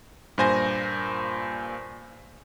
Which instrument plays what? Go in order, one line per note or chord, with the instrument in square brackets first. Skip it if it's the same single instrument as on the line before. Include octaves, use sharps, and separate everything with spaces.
[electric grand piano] G2 A#2 C5 G#5 A#6